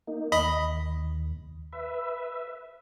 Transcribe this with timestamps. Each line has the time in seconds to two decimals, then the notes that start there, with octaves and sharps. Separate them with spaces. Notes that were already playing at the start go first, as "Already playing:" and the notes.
0.07 A#3 D#4
0.32 D#2 D#5 B5
1.73 B4 E5